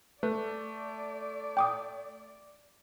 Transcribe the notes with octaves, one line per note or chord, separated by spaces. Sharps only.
A3 B4 D5
G5 D6 D#6